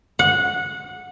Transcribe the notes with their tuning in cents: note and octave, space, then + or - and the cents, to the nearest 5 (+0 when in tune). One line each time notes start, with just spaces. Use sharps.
F#5 -20